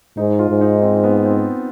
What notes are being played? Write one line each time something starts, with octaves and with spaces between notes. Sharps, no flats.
G#2 D#4
F4
G#2
D#4
C4
B3
C4